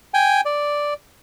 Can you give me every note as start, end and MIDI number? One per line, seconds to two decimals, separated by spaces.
0.14 0.41 79
0.14 0.41 80
0.45 0.94 74